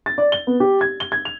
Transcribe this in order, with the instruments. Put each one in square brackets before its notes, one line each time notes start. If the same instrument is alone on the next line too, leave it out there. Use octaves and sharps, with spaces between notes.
[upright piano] A6
D5
G7
B3
G4
G#6
G7
G#6
F7